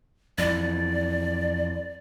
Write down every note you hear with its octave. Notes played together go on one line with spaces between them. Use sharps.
F2 E3 D5